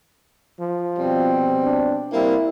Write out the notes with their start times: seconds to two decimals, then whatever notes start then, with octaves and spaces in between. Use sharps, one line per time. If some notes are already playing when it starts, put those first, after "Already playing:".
0.60 F3
0.99 B2 G3 C4
1.64 D4
2.13 G3 A#3 C4 E4